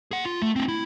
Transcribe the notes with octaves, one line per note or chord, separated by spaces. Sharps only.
G#4 F#5
F4
A3
C4 D4
E4